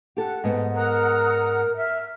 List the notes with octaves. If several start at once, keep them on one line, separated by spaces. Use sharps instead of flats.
G4 A4 F#5
G#2 B3
A#4 F#5 A#5 D#6
E5 F6